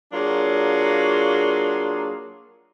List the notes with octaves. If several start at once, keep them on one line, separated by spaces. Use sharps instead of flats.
F#3 A#3 D4 F4 G#4